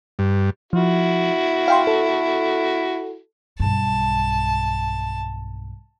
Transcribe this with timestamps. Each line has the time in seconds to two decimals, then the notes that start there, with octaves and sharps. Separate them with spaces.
0.19 G2
0.73 F3 E4 F#4
1.68 F5 G5 C6
1.87 A4
3.60 B1 G2 A5